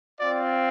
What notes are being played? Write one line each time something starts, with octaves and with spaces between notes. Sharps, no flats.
C4 F4 D5